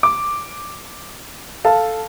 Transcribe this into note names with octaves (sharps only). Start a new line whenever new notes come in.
D6
A4 F5 A5